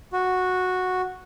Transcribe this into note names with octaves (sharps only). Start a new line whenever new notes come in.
F#4